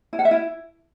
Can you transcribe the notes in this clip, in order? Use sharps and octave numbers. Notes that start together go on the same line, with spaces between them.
E4
F#5
E5
E4